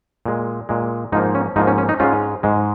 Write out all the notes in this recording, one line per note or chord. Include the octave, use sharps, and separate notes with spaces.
A#2 G#3
A#2 G#3
G#2 F3 A#3 D#4
C#4
G#2 F3 A#3 D#4
C#4
C#4
D#4
G#2 G#3 C#4 F4
G#2 G#3